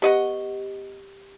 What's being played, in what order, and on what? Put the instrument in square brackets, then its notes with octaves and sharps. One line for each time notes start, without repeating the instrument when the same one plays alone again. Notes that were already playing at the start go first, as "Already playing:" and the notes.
[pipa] B3 D#5 F#5 [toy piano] G4